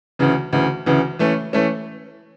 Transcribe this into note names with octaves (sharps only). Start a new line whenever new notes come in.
D2 C#3 E3
D2 C#3 E3
D2 C#3 E3
E3 A3 C#4
E3 A3 C#4